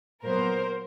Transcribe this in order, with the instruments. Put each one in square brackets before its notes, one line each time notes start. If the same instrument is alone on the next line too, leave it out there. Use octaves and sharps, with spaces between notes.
[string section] A#2 F#3 B3 A#4 C5